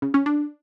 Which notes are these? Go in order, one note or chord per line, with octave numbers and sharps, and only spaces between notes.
C#3
C#4
D4